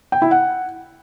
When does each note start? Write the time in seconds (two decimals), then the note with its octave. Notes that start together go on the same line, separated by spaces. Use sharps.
0.12 G5
0.22 E4
0.31 F#5